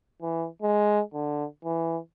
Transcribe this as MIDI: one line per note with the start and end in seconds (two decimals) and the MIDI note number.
0.22 0.46 52
0.62 1.01 56
1.14 1.45 50
1.64 1.98 52